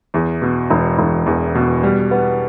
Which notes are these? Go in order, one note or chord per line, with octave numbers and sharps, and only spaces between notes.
E2
B2
E1
E1
E2
B2
G3
B3